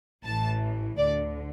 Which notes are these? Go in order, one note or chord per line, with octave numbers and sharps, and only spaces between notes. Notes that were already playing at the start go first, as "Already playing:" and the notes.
A1 A2 E3 A5
D2 D3 D5